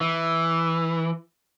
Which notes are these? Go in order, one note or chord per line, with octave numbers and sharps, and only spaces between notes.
E3